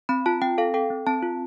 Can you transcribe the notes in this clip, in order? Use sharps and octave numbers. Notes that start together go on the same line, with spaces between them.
C4 B5
F4 A5
C4 G5
A4 F5
A4 G5
C4
C4 A5
F4